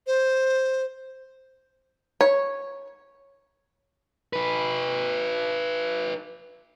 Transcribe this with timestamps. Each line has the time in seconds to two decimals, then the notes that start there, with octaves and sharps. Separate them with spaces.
0.07 C5
2.21 C#5
4.33 D#4 B4